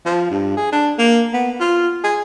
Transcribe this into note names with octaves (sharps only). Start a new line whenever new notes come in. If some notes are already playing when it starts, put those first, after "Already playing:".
F3
G2
G#4
D4
A#3
B3
F4
G#4